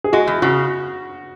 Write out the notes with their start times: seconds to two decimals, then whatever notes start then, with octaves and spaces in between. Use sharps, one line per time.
0.04 G#4
0.13 G#3 F#4
0.27 E2
0.42 C#3 F#4